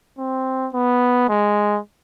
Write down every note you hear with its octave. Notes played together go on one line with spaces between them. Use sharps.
C4
B3
G#3